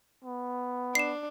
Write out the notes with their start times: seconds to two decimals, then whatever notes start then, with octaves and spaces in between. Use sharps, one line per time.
0.24 B3
0.95 D4 C7 E7